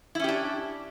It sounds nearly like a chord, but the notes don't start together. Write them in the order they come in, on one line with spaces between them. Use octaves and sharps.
E4 C#4 G4 D4